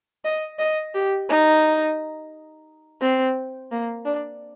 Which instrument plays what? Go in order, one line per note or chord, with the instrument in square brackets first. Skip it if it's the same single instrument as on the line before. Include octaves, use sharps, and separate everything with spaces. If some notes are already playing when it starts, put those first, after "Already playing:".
[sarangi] D#5
D#5
G4
D#4
C4
A#3
D4